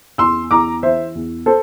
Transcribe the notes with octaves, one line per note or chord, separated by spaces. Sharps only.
E2 C6 E6
E2 A#5 D6
E3 C5 E5
E2
A4 C5